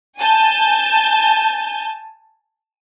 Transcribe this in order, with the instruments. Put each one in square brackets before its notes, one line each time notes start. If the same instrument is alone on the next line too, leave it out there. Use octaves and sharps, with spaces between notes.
[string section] G#5 A5 G6